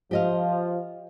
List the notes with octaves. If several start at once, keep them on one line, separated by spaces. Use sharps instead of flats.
F3 G4 D#5 F5